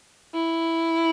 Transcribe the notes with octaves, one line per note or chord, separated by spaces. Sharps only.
E4